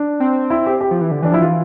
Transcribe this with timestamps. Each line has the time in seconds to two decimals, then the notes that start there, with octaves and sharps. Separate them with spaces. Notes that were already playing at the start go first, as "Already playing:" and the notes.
Already playing: D4
0.20 C4
0.50 E4
0.66 G4
0.81 G4
0.91 F3
1.01 E3
1.11 D3
1.22 E3 D4
1.32 F3 E4
1.42 E3 F4